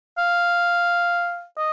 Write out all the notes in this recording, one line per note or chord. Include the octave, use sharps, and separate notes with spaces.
F5
D#5